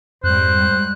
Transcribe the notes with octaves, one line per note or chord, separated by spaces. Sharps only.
F2 G#2 G3 C5 F#6